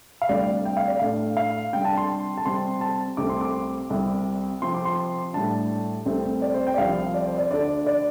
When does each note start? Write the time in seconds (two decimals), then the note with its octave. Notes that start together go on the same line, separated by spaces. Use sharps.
0.21 F5
0.29 D2 C3 G3 D4 D5
0.65 G5
0.77 F5
0.88 D5
0.99 A2 A3 D4 F5
1.37 F5
1.73 C3 G3 D4 G5
1.85 A5
1.97 C6
2.38 A5
2.45 C3 G3 C4 C6
2.81 A5
3.17 C2 C3 A3 C4 D6
3.29 C6
3.41 D6
3.90 C2 C3 G3 C4
4.62 C3 F3 C4 C6
4.74 D6
4.85 C6
5.33 A2 G3 D4 A5
6.06 C2 C3 A3 C4
6.42 D5
6.54 C5
6.67 G5
6.74 D5
6.78 C2 C3 F3 F5
7.14 D5
7.26 C5
7.38 D5
7.51 D2 D3 A3 D4 D5
7.87 D5